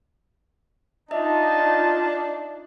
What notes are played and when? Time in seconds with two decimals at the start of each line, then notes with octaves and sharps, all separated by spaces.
1.11 D4 D#4 F4 D#5 E5 A5